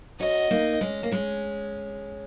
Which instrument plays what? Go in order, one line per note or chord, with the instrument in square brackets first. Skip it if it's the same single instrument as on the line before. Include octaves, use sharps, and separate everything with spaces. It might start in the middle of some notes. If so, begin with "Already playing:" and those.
[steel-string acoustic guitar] C#4 F#4 [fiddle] D#5
[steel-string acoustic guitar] A#3 D#4
G#3 C#4
A#3
G#3 C#4